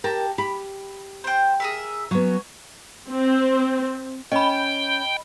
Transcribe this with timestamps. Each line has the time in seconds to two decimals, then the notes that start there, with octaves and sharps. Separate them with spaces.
0.04 G4 A#4 A5 A#5
0.38 G4 B5
1.24 C5 G5
1.60 G#4 A#4 E5
2.11 F#3 B3 C#4 C#5
3.09 C4
4.32 C#4 D#5 G5 B5